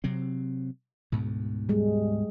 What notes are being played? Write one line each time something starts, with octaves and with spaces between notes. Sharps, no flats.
C3 F#3 C4
D2 G#2 B2
G3 G#3